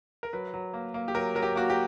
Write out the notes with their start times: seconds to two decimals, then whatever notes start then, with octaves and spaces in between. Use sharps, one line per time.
0.23 A#4
0.33 F#3 B4
0.54 F#3
0.74 A#3
0.94 A#3
1.08 G4
1.15 F#3 A#4
1.35 F#3 A#4
1.43 G4
1.56 A#3 F#4
1.70 G4